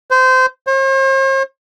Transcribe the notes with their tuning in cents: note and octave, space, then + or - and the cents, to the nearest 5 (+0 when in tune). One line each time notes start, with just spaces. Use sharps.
C5 -20
C5 +45